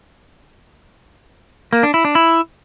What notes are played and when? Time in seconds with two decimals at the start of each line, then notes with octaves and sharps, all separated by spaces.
1.73 A#3
1.83 D4
1.94 E4
2.05 D4
2.15 E4